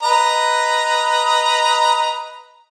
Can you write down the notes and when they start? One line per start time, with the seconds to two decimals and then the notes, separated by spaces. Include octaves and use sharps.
0.03 B4 D#5 A#5